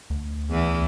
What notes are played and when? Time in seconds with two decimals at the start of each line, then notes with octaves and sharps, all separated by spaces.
0.10 D2
0.50 E2 E3